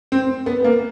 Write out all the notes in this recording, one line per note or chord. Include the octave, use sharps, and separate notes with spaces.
C4
B3
A#3